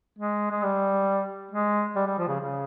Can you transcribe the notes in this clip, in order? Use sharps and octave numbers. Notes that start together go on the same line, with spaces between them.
G#3
G#3
G3
G#3
G3
G3
F3
C#3
C#3